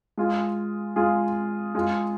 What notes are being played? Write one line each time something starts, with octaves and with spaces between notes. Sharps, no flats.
G#3 F4 G#4
G#3 F4 G#4
G#3 F4 G#4